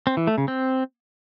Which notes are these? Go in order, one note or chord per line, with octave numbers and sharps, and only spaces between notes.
C4
E3
A3
C#3
C4